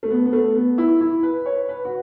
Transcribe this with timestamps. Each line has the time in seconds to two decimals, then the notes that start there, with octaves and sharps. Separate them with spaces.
0.03 A3
0.11 B3
0.26 B3
0.33 A3
0.55 B3
0.78 E4
1.01 E4
1.23 B4
1.46 C#5
1.69 B4
1.85 F#4